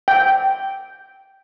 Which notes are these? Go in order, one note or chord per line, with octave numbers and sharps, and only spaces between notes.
G5